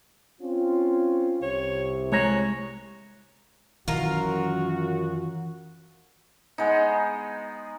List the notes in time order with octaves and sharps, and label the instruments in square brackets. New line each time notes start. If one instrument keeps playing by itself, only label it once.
[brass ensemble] C4 C#4 F4
[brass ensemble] C2 C3 [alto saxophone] C#5
[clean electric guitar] G#3 A#5 [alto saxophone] C#5
[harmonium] F#2 [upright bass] D#3 E3 [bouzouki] F4 A#4 [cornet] F#4
[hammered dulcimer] G#3 B3 D#4